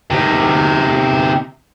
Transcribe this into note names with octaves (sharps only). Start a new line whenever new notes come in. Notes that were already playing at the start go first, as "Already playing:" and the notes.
C3 D#4